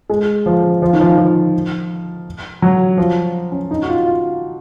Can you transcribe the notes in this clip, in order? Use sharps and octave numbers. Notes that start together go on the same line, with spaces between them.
G#3
F3
F3
F3
D#3
F3
F3
F#3
F3
C#4
D#4
F#4
F4
F4